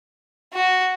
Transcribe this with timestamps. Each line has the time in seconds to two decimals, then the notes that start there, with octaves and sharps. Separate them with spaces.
0.54 F#4